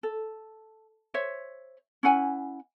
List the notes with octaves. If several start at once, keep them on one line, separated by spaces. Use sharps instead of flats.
A4
C5 C#5 E5
C#4 E4 F#5 G#5